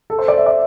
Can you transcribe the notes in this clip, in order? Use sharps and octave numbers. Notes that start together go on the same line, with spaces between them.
A4
C5
D5
E5
D5